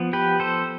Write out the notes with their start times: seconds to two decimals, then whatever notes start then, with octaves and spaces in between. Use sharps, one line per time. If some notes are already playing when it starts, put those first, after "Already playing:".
Already playing: F3 B3
0.13 G4 B4
0.40 A4 C5